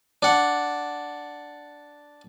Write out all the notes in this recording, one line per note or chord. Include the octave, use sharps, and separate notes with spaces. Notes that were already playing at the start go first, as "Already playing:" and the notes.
D4 F#5